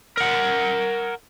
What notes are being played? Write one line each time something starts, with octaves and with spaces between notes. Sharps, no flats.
A#4 F#5